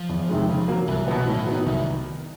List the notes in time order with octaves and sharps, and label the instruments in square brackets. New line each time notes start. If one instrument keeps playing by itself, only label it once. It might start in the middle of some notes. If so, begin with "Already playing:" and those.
Already playing: [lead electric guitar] F3
[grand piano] E2
C3 D#3 G#3
C#3
F#3 A#3
[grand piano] C2 [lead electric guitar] E3
[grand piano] B2 F#3 B3 [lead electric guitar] E3
[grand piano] A2 [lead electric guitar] D#3
[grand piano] F#3 B3 D#4
[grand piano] C2 [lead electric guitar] D#3
[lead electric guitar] D#3